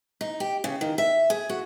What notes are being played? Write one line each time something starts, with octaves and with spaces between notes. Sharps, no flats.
D#4
G4
C#3
D#3
E5
G#4
F#4